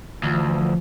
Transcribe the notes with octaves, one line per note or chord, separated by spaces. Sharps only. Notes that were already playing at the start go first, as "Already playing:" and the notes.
D2 E3 F3